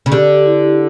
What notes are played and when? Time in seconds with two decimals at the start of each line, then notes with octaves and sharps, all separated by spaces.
0.06 C#3
0.12 D3 G4
0.46 E4